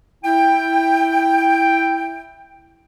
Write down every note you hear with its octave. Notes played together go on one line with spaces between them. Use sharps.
E4 G5